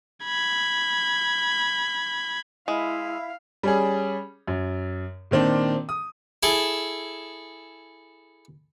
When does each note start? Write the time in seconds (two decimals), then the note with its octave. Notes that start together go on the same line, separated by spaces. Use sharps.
0.24 B5 G#6
2.68 G#3 E4 F5
3.63 G3 C#4 G#4
4.48 F#2
5.31 A#2 D#3 C4 D4
5.89 D#6
6.43 E4 G#4 A4